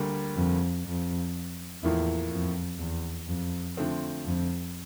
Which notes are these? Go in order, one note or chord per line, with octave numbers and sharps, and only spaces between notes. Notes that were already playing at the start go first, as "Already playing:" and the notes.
Already playing: D2 D3 G3 A#3
F2
F2
E2 A2 F3 A#3 E4
F2
E2
F2
D3 F3 A3 C4
F2